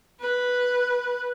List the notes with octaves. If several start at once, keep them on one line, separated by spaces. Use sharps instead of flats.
B4